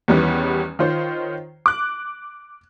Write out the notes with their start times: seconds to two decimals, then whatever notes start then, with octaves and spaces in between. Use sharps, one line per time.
0.08 E2 D#3 E3 G3 B3 C#4
0.79 D#3 F4 C5 C#5
1.66 D6 F#6